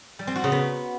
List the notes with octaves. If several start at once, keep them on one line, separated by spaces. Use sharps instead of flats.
G3
C4
F#4
C#3
B3